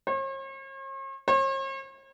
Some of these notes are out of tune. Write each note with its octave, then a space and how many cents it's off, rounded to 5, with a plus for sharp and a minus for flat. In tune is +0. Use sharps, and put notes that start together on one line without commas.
C#5 -45
C#5 -45